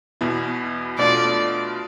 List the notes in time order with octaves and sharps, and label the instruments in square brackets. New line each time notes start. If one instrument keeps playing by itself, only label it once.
[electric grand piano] E2 B2 B3 E4
[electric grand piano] B2 A3 D4 F4 [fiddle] D5